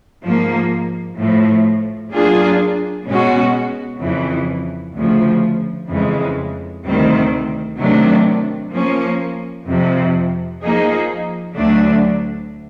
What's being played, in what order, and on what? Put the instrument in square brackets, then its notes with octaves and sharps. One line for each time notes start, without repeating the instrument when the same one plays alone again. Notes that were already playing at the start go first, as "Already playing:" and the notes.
[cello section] G#2 F3 A#3
A2 F3 A3
F#3 A#3 D4 F4 G#4
B2 G#3 C#4 F#4
F2 C#3 E3
D2 C#3 F3
F2 C#3 E3 G#3
D2 C3 D#3 G3 C4
C3 D#3 F#3 A3 D4
F3 A#3 C#4
F2 C3 F3
F3 A#3 D#4 G#4
D2 D3 F#3 A3 D4